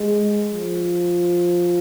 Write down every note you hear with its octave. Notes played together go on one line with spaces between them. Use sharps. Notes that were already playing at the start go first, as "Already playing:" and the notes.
Already playing: G#3
F3